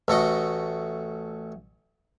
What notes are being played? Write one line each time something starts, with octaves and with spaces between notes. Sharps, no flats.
A1 A3 F#4 D#5